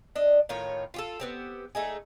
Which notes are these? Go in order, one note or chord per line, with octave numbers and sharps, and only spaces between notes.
D4 D#5
A2 D#3 F4 C#5
F4 G4 A4
B3 C4 G4
A3 D#4 G#4